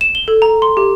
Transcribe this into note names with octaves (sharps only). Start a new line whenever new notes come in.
E7
G7
A4
A#5
C6
G4